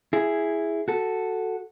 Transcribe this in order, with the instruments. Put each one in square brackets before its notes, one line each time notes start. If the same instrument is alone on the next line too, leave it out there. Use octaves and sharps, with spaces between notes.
[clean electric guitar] E4 G#4
F#4 A4